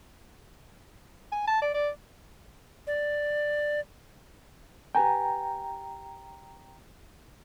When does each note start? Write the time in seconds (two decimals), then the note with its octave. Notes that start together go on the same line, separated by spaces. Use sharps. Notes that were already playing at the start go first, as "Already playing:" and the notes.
1.32 G#5
1.47 A5
1.62 D5
1.74 D5
2.87 D5
4.95 G4 B4 G5 G#5 A#5